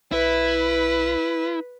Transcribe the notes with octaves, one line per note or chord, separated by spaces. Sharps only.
B1 E4 B4